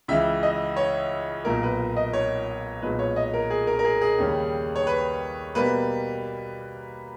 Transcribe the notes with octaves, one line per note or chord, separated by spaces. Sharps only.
C#2 C#3 E3 E5
D#5
C#5
B1 A#2 A#3 A#4
B4
D#5
C#5
B1 A#2 G#3 B4
C#5
D#5
A#4
G#4
A#4
A#4
G#4
G#4
D#2 C#3 G3 C#4
C#5
B4
B2 G3 A#3 B4